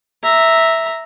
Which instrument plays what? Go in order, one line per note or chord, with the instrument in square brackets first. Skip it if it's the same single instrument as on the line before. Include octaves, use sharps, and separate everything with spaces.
[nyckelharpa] E5 A#5